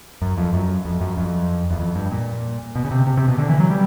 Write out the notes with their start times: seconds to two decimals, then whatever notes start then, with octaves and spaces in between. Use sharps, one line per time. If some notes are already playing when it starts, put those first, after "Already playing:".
0.22 F#2
0.38 F2
0.53 F#2
0.85 F2
1.01 F#2
1.17 F2
1.71 E2
1.80 F2
1.96 G2
2.12 A#2
2.75 B2
2.85 C#3
2.91 C3
3.07 C3
3.17 C3
3.28 B2
3.38 D3
3.49 E3
3.60 F#3
3.70 G3